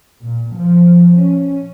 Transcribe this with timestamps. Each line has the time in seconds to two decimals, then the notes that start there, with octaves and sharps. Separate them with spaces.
0.23 A#2
0.56 F3
1.13 C#4